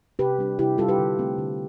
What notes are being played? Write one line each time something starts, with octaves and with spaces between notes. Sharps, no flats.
C3 G4 B4
G3 D4
C3 E4 G4
G3 D4 F4 A4
G4 B4
D3
A3 C4
D3